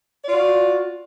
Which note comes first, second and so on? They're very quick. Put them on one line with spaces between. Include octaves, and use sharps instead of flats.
D5 F4 F#4